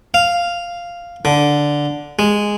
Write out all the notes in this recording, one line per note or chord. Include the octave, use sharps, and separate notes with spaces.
F5
D3
G#3